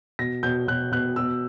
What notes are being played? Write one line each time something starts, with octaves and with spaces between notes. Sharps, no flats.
B2 A#6
B2 G6
B2 F#6
B2 F#6
B2 E6